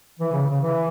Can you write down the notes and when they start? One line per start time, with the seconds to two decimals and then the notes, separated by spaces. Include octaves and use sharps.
0.19 E3
0.33 C#3
0.47 C#3
0.61 E3